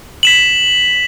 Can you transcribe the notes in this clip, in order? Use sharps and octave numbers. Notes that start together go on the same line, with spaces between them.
B6 E7 F#7